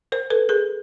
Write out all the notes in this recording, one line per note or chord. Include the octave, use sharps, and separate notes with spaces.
A#4 C5
A4 B4
G#4 A#4